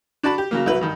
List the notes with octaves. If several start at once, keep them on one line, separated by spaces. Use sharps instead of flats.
D4 F#4 D5 A5 B5
G4
C#3 F#3 A#3
C2 F#3 E4 B4
G2 D#3